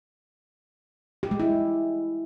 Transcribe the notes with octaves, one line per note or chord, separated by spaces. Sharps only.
G4
G#3
E4